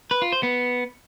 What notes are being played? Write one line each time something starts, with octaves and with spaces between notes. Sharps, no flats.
B4
F4
C5
B3